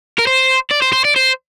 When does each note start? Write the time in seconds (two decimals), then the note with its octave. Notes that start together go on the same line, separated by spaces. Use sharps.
0.19 A#4
0.27 C5
0.71 D5
0.82 C5
0.93 C5
1.05 D5
1.16 C5